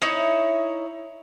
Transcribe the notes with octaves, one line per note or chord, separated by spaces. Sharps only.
D#4 E4 C#5